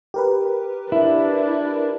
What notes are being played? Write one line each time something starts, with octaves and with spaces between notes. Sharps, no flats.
G4 A#4 B4
D4 E4